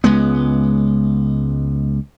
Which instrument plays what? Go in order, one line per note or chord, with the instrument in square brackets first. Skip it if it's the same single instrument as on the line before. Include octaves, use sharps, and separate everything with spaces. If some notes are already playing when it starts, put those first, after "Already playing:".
[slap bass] C#2 G#3 B3